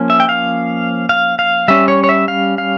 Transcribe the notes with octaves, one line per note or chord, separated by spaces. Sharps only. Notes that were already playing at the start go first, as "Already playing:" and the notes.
Already playing: F3 A#3 C#4
E5
G5
F5
F5
F5
G3 C#4 E5
C#5
C#5
E5
F5
F5